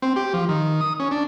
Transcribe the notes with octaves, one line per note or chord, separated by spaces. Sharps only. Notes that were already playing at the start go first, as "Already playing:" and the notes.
C4
G4
F3
D#3
D#6
C#4
D4